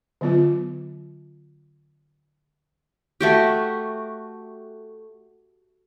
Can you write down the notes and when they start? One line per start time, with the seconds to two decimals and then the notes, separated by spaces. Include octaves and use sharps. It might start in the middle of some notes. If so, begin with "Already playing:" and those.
0.21 D3 F#3 B3 F4
3.21 A3 F#4 G4